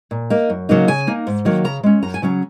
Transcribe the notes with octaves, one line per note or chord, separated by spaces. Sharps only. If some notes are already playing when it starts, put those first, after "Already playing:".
A#2
A#3 D#4
F#2
C#3 F#3 A#3 D#4
C#3 G#5
A#3 D#4
G#2
D#3 F#3 A#3
C#3 A#5
G#3 C#4
F#2 A#5
G#5
C#3 F#3 C#4 A#5